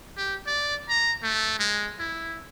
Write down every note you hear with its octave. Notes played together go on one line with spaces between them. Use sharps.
G4
D5
A#5
A3
G#3
E4